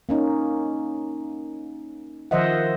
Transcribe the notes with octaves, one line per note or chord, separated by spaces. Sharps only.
A#3 C#4 D#4
D#3 F3 C5 D#5 E5 F#5